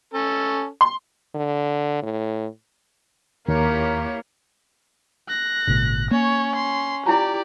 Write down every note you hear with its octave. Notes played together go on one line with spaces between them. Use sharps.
C#4 A4
C6
D3
A2
D#2 A#3 E4 G4 A#4 C#5
F#6 A#6
G#1 A#2 C#3
A#3 C#4 C#5
C6
E4 F4 G4 D5 A#5